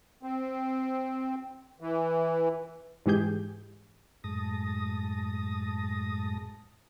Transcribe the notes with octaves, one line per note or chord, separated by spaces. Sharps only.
C4
E3
G#2 E3 G#3 G4 G#4 G6
F#2 A2 G#3 A5 D#6 A#6